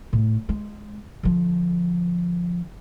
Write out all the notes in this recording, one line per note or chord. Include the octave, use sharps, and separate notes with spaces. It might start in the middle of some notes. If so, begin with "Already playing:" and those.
A2
G#3
D3 F3